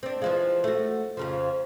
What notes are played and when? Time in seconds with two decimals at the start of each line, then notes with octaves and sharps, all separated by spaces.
0.03 C4 D4
0.22 E3 F3 G#3
0.64 A3 F#4
1.17 F2 C#3 F3